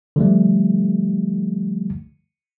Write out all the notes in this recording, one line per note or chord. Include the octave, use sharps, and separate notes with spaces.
D3 F3 G3 A3